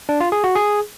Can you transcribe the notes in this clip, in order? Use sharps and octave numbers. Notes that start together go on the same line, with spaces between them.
D4
F4
G#4
F#4
G#4